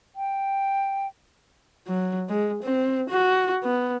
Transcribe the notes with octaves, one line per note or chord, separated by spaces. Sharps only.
G5
F#3
G#3
C4
F#4
B3